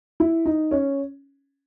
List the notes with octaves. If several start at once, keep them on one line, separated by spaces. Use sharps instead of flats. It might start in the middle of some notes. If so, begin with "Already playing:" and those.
E4
D#4
C#4